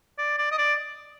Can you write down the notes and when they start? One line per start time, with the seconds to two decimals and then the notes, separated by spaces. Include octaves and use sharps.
0.18 D5
0.38 D5
0.51 D#5
0.58 D5